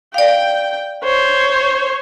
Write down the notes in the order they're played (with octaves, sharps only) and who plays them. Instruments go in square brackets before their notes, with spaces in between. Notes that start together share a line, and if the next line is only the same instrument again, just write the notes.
[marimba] D5 F5 [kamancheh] G5
[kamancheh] C5 C#5